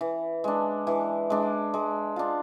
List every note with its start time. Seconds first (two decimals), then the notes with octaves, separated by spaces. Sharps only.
0.01 E3
0.44 G#3 D4
0.87 E3
1.30 G#3 D4
1.74 G#3
2.16 D4 F4